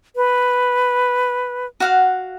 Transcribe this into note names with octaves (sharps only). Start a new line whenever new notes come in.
B4
F#4 F5 F#5